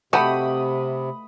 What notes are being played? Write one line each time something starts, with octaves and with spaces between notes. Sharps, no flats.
C3 A3 F#4 G4 B5 D#6